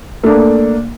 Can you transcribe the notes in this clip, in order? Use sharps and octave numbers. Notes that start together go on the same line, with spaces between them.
A3 A#3 D4